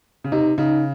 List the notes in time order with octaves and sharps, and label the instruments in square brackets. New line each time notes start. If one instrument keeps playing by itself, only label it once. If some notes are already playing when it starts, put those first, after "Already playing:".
[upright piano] C#3
[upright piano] C3 [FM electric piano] D#4
[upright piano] C#3 [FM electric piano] D#4